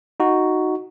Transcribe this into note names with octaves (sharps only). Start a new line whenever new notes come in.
D#4 F#4